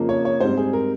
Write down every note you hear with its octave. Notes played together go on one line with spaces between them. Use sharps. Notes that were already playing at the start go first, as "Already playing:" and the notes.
Already playing: F2 C#3 F3 A#3
C#5
C#5
G#2 G3 C4 C5
G#4
A#4